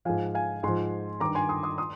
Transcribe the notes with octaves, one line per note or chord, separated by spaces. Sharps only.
G#2 F3 F5 G#5
F5 G#5
G#2 F3 G#5 C6
G2 D#3 A#5 D6
G#5 C6
C6 D#6
C6 D#6
C6 D#6